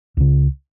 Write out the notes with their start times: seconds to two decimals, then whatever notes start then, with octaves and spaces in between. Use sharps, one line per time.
0.17 C#2 C#3